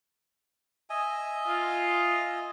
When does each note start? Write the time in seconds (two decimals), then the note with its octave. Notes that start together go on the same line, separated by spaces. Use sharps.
0.90 D#5 E5 G#5
1.48 F4